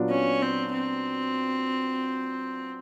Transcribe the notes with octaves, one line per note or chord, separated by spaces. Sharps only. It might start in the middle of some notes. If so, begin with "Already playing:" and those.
Already playing: A#2 F#3 B3 D4 F4
C#4
C4
C4